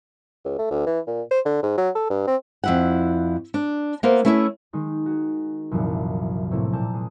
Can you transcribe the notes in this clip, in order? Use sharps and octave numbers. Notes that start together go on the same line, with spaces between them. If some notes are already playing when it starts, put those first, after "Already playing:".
C#2
A3
D2
E3
A#2
C5
D3
G#2
F#3
A4
G2
C4
F2 E4 F#5
D4
A#3 B3 E4 C5 F5
A3 C#4 E4 B4 E5
D#3 G#3 D#4 A#4
F#4 G#4
C2 F#2 A#2 E3 F3
A2 C3 A3 A#3 C4 E4
A#2 A#3 E5 A5 G6 E7
G#3 D#6